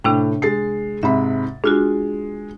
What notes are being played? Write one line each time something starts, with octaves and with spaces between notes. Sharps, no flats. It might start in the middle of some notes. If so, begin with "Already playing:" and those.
A2 C3 D4 G5
G#3 A6 C7
G#2 C3 E5 B5
G#3 D4 F4 F#4